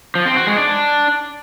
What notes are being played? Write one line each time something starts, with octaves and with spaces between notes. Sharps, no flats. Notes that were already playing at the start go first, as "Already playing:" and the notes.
F3
C4
F#4
G#3
D4